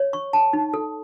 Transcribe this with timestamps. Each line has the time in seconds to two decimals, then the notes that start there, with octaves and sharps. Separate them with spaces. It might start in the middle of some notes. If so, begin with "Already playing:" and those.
Already playing: C#5
0.13 C#6
0.33 A5
0.53 D#4
0.74 A4